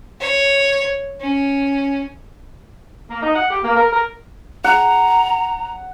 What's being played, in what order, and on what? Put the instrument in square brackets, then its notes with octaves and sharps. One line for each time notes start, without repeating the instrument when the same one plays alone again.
[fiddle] C#5
C#4
[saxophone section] A#3
D#4
F#5
G4
A#3
A#4
A#4
[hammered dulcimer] F#5 [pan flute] A#5